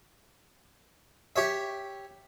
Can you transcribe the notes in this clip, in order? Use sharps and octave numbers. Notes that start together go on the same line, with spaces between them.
G4 C#5 E5